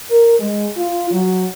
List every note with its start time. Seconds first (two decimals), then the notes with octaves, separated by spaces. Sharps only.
0.10 A#4
0.39 G#3
0.77 F4
1.11 F#3